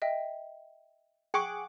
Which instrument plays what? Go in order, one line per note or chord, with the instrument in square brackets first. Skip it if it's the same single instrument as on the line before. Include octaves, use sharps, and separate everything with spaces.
[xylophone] D#5 E5 G5
[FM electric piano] G#4 F#5 D6 [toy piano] G5 C#6